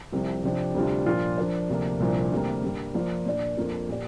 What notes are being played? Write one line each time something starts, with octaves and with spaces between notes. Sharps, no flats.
C2 C3 F3
C3 F3 D4 G4
D2 C3 G3 D4 F4
A#2 F3 D4 F4
F3 D4 A#4 D5
D2 C3 F3 A#3 D4
C2 A#2 F3 D4
D2 C3 G3 A#3
G2 G3 A#3
F3 A#3 F4 A#4 D5
A#2 A#3 D4 A#4 D5
F2 F3 A#3 D4 F4
A#2 A#3 G4 D5